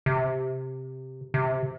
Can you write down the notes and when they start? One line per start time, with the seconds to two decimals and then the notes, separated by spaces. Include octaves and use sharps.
0.06 C3
1.34 C3